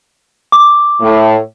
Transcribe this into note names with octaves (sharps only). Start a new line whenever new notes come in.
D6
A2 A3